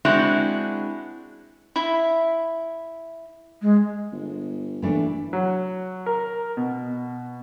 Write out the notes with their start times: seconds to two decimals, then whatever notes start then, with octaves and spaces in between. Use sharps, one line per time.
0.05 G#3 C4 D4 E4 F#4
1.76 E4 E5
3.62 G#3
4.12 G1
4.82 F#1 E3 A3 D4
5.33 F#3
6.06 A#4
6.57 B2